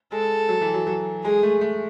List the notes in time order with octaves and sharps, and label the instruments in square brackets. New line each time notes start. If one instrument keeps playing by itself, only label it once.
[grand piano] G#3 [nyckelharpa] A4
[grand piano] F#3
E3
F#3
F#3
[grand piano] G#3 [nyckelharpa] G#4
[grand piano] A3
A3